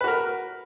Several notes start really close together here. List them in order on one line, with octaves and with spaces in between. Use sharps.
B4 F#4 A#4